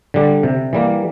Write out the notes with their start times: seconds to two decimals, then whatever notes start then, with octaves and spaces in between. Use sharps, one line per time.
0.14 D3 G3
0.43 C3
0.73 E3 G3 A#3